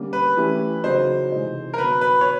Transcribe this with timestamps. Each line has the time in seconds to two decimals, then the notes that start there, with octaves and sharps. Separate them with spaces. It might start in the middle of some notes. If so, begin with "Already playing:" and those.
Already playing: D3 G3 A#3 C#4
0.13 B4
0.37 E3 A3 C#4 E4 G4
0.84 C#3 F#3 A#3 D#4 C5
1.32 C3 E3 G#3 C4 D#4
1.74 A#4
1.78 D3 F#3 B3 B4
2.01 B4
2.21 C#5